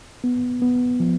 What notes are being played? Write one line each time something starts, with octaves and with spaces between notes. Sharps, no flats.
B3
B3
F3